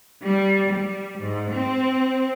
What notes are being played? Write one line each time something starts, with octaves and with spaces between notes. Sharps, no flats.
G3
G3
G#2
C4